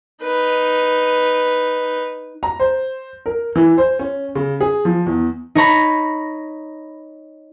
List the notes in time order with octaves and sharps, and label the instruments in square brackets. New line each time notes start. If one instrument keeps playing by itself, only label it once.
[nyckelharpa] D#4 B4
[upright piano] A#5
C5
A#4
E3
C5
C#4
C#3
G#4
F3
E2
[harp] D#4 C#5 A#5 B5